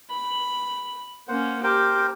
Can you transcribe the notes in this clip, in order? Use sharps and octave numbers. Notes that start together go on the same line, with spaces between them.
B5
A#3 C#4 C5 F#5
G4 A#4 C5 G5